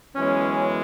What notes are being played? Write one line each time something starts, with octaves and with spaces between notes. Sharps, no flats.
F#2 E3 G#3 B3 C#4